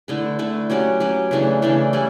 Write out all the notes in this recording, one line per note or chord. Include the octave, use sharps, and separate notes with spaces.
D3 A3 E4 B4
D3 A3 E4 B4
F#3 C#4 G4 B4
F#3 C#4 G4 B4
C#3 E3 A3 D4
C#3 E3 A3 D4
G3 C#4 E4 B4